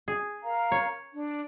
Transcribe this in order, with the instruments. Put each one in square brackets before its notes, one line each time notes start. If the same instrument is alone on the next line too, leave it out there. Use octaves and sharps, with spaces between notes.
[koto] G#4
[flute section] A#4 F5 A#5
[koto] C#5
[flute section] D4